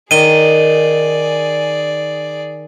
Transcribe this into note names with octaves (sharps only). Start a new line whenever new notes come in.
D#3 G#4 D5 D#7 G7